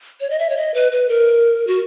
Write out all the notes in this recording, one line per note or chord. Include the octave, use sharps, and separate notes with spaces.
C#5
D#5
E5
C#5
D#5
B4
B4
A#4
F#4